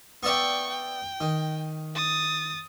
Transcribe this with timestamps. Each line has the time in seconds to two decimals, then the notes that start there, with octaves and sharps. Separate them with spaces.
0.23 B3 D5 E5 G5 C#6
0.70 G5
1.21 D#3
1.95 D#6 A6